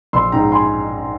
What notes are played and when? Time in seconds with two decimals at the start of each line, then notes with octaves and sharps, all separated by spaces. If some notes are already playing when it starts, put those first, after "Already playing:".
0.13 A#1 C6 E6
0.32 G#2 G5 A#5
0.52 G#5 C6